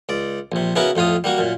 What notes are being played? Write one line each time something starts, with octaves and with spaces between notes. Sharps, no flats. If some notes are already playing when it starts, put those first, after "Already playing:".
C#2 D5
A#1 C3
C#3 B3 C#4 E4 F#4 A#4
F2 A2 F4 F5 D#6
G3 A#3 F#4
F#2 A#2